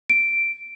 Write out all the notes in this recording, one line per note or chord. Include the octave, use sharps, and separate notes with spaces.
D7